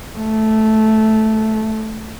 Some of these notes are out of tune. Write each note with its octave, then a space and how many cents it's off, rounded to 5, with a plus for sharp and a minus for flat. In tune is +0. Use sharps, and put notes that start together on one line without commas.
A3 -10